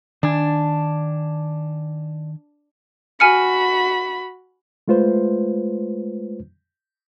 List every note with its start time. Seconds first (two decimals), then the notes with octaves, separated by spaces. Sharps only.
0.23 D#3 D4 G#5
3.20 F#4 G#5 B5 F6 C#7
4.88 G#3 A3 F4 B4 C5